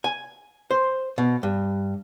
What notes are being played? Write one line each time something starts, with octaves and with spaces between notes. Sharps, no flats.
G#5
C5
B2
G2